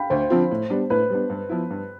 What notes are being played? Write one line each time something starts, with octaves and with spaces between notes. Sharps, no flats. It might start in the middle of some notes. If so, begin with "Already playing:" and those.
Already playing: F5 G5 B5
D2 C5
D3 F3 C4 F4
A2
G3 B3 D4
A2 B4
G3 B3 D4
G2
F3 B3 E4
G2